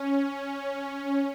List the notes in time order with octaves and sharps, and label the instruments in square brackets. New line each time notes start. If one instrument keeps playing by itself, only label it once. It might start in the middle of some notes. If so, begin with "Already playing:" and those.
Already playing: [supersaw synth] C#4